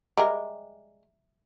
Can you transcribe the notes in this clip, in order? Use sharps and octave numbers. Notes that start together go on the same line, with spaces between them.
G3 G#3 A#4 E5 A#5 D6